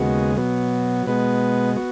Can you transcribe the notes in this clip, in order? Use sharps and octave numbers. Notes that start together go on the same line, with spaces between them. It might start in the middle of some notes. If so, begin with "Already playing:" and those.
Already playing: D#2 C#3 G#3 B3 F#4
B2 F#3 B3
B2 G#3 B3 B4
B3 F#4